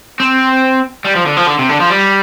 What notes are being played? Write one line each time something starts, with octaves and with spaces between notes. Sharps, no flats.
C4
G3
F3
D3
F3
D3
C3
D3
F3
G3